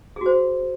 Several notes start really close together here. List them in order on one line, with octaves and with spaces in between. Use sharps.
G#4 F#4 C5